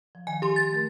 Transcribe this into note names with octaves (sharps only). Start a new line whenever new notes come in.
F3
D#3 F3 G#5
G4 C6
A6
A3 G4 A#4